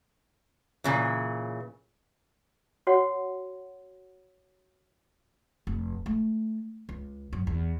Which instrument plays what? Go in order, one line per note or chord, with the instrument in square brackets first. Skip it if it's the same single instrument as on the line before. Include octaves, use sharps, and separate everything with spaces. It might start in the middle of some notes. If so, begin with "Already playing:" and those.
[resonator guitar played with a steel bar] A#2 C#3 E3
[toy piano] F#4 C#5 F#5
[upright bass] F1
A3
C#2
F#2
E2